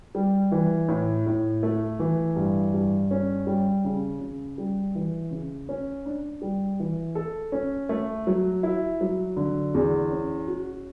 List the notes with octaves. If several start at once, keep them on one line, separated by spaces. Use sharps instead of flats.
G3
E3
A2
A2
A3
E3
G2
G2
C#4
G3
C#3
C#3
G3
E3
C#3
C#4
D4
G3
E3
A4
C#4
A3
F#3
E4
F#3
D3
E2
C#4
F#4